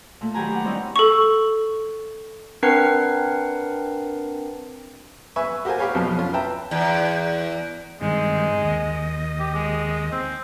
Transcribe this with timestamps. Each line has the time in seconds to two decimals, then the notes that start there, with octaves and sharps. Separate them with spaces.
0.21 A#2 A3
0.34 D#3 F#3 G4 B4 G#5 A#5
0.51 G4 F#5
0.64 G3 C4 C#4 D#4 E4
0.96 A4 C#6
2.63 C4 D4 A#4 B4 F#5 C7
5.36 B4 E5 G#5 C#6
5.65 F#4 G4 A#4 C5 F5 G#5
5.79 G4 B4 C#5 F5 G#5
5.94 B1 F2 B2 F3
6.18 C#4 F4
6.33 B4 E5 G5 A5 A#5
6.71 E2
8.01 G2 D#3 G#3 C4
8.62 D#2 D#5
9.40 G4
9.55 G#3
10.12 C4